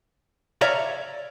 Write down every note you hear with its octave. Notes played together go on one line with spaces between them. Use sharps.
C#5 D5 E5 F5 A#5